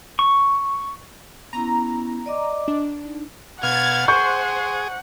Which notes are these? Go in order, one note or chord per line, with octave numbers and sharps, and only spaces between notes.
C#6
B3 C#4 E4 A#5
D5 D#5 D6
D4
D#4
B2 F5 F#5 F6 G#6 A6
G#4 C5 C6 C#6 G6